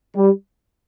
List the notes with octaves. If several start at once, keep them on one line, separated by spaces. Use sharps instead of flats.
G3